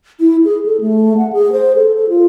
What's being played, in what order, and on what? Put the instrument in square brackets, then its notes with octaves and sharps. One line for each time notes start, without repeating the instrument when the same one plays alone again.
[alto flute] E4
G#4
A4
A3
F#5
G#4
C5
A4
A4
F4